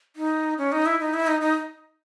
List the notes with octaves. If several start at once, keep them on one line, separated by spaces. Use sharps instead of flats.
D#4
C#4
D#4
E4
D#4
E4
D#4
D#4